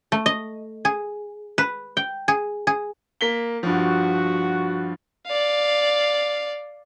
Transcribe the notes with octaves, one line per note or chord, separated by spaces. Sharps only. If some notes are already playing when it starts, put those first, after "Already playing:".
A3
D#5
G#4
B4
G5
G#4
G#4
A#3 B6 G7
G2 F3 F#4
D5 F5